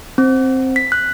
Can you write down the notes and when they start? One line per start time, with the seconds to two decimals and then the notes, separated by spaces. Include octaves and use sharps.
0.18 C4
0.76 B6
0.92 F#6